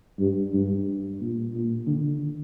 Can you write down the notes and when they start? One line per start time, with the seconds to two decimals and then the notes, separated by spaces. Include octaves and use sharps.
0.19 G2
0.53 G2
1.20 A#2
1.53 A#2
1.87 D3